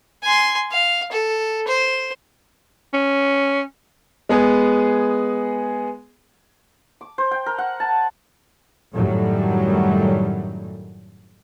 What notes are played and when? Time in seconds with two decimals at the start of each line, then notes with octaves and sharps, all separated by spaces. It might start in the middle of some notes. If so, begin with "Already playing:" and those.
0.23 G#5 C6
0.71 F5
1.12 A4
1.67 C5
2.93 C#4
4.29 G#3 B3 G#4
7.01 D6
7.18 C5
7.31 G5
7.46 A#4
7.58 F#5
7.80 A5
8.94 F#2 A2 D#3 F#3 G3 A3